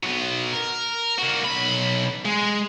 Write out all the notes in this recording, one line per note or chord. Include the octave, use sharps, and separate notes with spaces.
F#3 B3
A#4
A#3 F#4
B1 B5
G#3